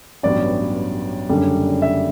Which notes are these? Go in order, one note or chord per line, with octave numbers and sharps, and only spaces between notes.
A1 G2 F#3 B3 D5
F#1 F#2 D3 G3 D4
E5